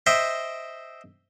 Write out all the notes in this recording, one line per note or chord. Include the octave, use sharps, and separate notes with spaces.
C5 D#5 E5 G5